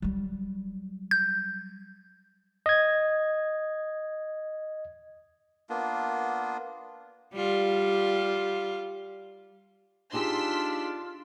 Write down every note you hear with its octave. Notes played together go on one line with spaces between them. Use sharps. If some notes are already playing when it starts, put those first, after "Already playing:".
F#3 G3
G6
D#5 G#6
A#3 B3 D4 F4
G3 F4
D4 D#4 F4 G4 G#4 C6 E6 B6